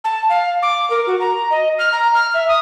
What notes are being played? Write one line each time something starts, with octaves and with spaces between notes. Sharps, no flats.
A5
F5
D6
A#4
F#4
A#5
D#5
F6
A#5
F6
E5
D#6